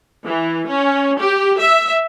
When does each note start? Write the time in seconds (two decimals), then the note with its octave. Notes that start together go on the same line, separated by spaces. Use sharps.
0.25 E3
0.69 C#4
1.18 G4
1.59 E5